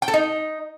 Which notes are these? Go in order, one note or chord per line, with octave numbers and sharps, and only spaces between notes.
G5
A4
D#4